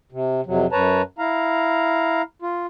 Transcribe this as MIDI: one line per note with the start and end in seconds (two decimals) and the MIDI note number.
0.12 0.41 48
0.46 0.66 41
0.46 0.66 48
0.46 0.66 54
0.72 1.02 42
0.72 1.02 71
0.72 1.02 73
0.72 1.02 81
0.72 1.02 82
1.18 2.22 64
1.18 2.22 77
1.18 2.22 82
2.42 2.66 65